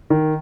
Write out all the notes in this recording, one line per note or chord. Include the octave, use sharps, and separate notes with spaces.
D#3